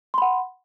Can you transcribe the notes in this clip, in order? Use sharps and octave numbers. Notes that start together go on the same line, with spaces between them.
F#5 B5 C6